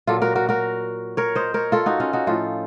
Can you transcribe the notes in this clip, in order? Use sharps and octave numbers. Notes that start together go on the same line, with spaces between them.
A#2 F#3 F4 A4
F#4 A#4
F#4 A#4
F#4 A#4
A#4 C#5
C5 D#5
A#4 C#5
F4 A4
D#4 F#4
C#4 F4
D#4 F#4
A2 F3 F4 A4